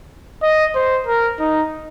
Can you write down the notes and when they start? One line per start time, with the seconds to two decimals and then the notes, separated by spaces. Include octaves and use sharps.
0.43 D#5
0.75 C5
1.07 A#4
1.39 D#4